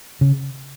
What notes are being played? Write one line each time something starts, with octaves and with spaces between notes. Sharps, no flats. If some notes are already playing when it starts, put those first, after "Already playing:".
C#3